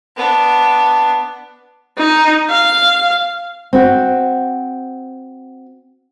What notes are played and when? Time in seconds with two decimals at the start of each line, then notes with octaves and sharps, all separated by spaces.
0.17 B3 D4
1.97 D#4
2.50 F5
3.73 C4 F#4